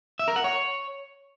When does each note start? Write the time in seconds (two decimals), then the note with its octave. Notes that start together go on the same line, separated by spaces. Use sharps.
0.19 E5
0.28 A#4
0.36 F#5
0.44 C#5